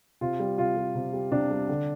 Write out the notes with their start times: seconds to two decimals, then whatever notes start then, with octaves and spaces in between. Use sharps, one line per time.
0.21 C3 F4
0.40 G3
0.58 C3 F4
0.76 G3
0.95 C3
1.13 G3
1.31 C3 D4
1.51 G3
1.69 D3